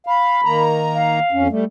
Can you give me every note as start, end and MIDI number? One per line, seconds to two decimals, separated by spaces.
0.07 0.41 77
0.07 0.62 83
0.45 1.20 51
0.45 1.20 58
0.45 1.20 82
0.94 1.46 77
1.32 1.48 41
1.32 1.48 61
1.49 1.65 55
1.49 1.65 57